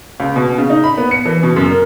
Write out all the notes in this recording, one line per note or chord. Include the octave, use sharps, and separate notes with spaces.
C#2
B2
C#3
D#4
B5
B3
C#7
E3
B2
F#2
A#4